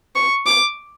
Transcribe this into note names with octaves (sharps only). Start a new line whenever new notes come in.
C#6
D6